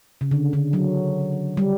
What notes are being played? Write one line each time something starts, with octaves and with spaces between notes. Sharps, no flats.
C#3
D3
D3
F#3
G3